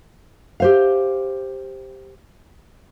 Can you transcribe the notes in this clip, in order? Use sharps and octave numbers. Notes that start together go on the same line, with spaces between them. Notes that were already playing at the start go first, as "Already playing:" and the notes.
G4 C5 F5